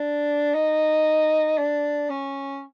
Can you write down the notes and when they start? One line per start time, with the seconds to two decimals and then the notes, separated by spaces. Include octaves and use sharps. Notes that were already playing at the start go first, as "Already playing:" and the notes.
Already playing: D4
0.54 D#4
1.58 D4
2.10 C#4